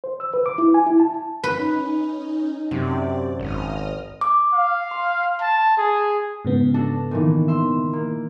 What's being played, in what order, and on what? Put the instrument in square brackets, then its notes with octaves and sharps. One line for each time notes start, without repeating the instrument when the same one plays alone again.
[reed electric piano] C5
E6
B4
D6
E4
G#5
E4
A5
[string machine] C#4 D#4 [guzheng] B4
[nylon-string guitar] F#2 [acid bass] C3 [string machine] D5
[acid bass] G#1 [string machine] D#5 D#6 F6
[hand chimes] D6
[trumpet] F5
[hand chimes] C6
[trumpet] A5
G#4
[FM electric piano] G#2 C#3 B3
[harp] D4 F#4 A4
A#2 D#3 E3
E5 C6
A#3